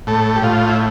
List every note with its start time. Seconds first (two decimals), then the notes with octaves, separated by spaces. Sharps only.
0.07 A2 A4
0.36 G4
0.42 A2 F4
0.69 E4